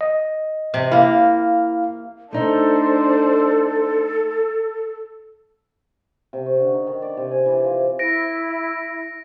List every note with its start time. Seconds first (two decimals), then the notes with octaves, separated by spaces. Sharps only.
0.01 D#5
0.74 C3
0.92 A#3 E4 F5
2.33 A3 D4 D#4 A4 C5
6.33 C3
6.46 C#6
6.60 D3
6.73 D#4
6.87 D#3
7.02 D5
7.17 C3
7.31 G#5
7.46 E3
7.64 F3
7.99 E4 A#6 D7